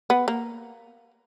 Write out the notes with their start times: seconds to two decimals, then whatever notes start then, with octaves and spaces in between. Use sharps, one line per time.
0.10 B3
0.28 A#3